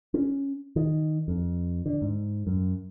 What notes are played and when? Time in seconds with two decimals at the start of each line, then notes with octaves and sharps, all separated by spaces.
0.14 C#4
0.76 D#3
1.28 F2
1.86 D3
2.02 G#2
2.47 F#2